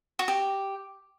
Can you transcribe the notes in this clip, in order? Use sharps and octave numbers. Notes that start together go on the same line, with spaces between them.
F#4
G4